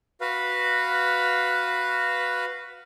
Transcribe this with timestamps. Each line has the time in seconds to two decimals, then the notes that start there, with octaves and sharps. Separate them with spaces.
0.21 F#4 B4 F5